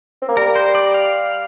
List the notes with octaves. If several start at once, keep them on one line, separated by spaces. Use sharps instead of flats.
C4
A#3
G3 A#4
C5
D5
F5